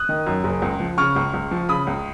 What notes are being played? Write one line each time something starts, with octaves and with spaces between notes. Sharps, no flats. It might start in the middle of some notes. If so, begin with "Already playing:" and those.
Already playing: D#6 F#6
D#3
F#2
F#1
C#2
F3
C#3 C#6 F6
C#2
C#2
F3
C#3 B5 D#6
C#2